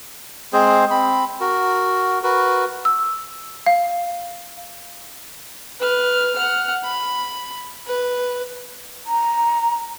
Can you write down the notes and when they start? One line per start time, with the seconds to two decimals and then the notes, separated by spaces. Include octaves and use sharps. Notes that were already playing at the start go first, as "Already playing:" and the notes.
0.53 G#3 C4 G#4 C5
0.91 C4 B5
1.41 F#4 A#4
2.23 F#4 A#4 B4
2.85 E6
3.66 F5
5.80 B4 F6
6.36 F#5 F6
6.84 B5
7.87 B4
9.06 A#5